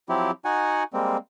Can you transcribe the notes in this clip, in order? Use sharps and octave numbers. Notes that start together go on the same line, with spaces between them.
F3 F#3 C4 E4 G4
D#4 F#4 F#5 G#5
G3 G#3 A#3 C4